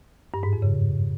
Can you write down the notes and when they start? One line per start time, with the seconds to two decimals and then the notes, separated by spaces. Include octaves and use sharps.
0.34 G2
0.43 G#2
0.53 F2
0.62 C#3